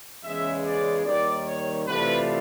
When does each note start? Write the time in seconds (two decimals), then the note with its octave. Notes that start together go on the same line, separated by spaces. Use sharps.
0.24 E2 C#3 E3 G#3 C#4 E5
0.64 D5
1.05 D#2 D#3 G3 D5
1.46 C#5
1.86 C3 E3 A3 D4 F4 B4